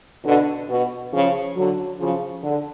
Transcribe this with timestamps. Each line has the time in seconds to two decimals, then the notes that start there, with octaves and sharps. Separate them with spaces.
0.24 B2 D3
0.69 B2
1.13 C#3 F3
1.56 D3 F#3
1.99 C#3 F3
2.43 D3